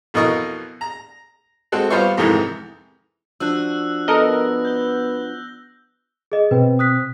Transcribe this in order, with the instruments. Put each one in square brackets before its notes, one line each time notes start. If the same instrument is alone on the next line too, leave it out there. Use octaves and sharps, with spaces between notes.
[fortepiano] F2 B2 E3 A#4 D#5 C#6
A#5
G#3 C4 F#4 A4
G3 B3 F4 C5 C#5 C#6
F2 G#2 C3 D#3 E3
[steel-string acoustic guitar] F3 D4 F#4 [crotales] E6 F#6
[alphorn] B3 [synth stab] A4 A#4 D#5 [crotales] A#6
[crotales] G6 G7
[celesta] G#4 D#5
[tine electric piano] B2 C4 [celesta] B4
[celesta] D#6 F#6 B6